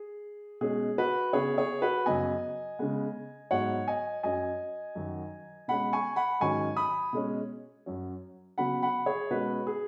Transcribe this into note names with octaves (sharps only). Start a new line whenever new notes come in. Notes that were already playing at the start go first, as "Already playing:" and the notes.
Already playing: G#4
B2 G#3 C#4 G#4
F#4 B4
C#3 B3 G#4 C#5
G#4 C#5
F#4 B4
F#2 C#3 B3 D#5 G#5
C#3 G#3 B3
G#2 F#3 B3 C#5 F#5
D#5 G#5
F#2 F#3 C#4 D#5 G#5
F#2 D#3 F#3
B2 G#3 C#4 F#5 B5
G#5 C#6
F#5 B5
G#2 D#3 F#3 C#4 G#5 C#6
B5 D#6
B2 G#3 C#4
F#2 F#3 C#4
C#3 F#3 B3 F#5 B5
F#5 B5
G#4 C#5
B2 G#3 C#4 F#4 B4
G#4